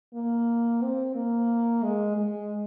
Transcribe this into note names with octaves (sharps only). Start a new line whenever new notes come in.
A#3
C4
A#3
G#3
G#3